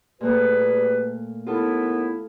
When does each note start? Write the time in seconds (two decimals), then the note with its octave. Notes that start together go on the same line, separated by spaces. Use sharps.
0.21 A#2 G3 A3 A#3 G#4 B4
1.47 D#2 B3 E4 F4 A4